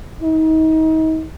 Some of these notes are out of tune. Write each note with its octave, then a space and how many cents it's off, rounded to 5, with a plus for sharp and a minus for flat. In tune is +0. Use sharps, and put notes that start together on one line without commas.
D#4 +35